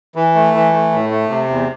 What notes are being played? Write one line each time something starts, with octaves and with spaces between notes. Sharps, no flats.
E3
A3
E3
A3
A2
A3
C3
E2